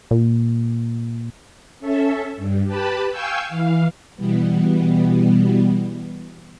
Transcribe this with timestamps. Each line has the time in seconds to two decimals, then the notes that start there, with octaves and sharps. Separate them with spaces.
0.11 A#2
1.80 C#4 A4 E5
2.37 G2
2.65 G4 B4 A5 B5
3.10 F5 G5 G#5 C#6 E6 G6
3.49 E3 F5
4.16 B2 E3 G3 B3